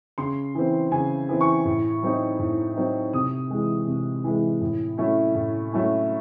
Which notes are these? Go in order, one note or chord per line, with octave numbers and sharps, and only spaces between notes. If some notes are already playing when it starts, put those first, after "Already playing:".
C#3 C6
E3 C4
C#3 G#5
E3 C4
C#6
A2
F#3 C4 D#4
A2
F#3 C4 D#4
C3 D#6
E3 G#3
C3
E3 G#3
A2
F#3 A3 C#4 E4
A2
F#3 A3 C#4 E4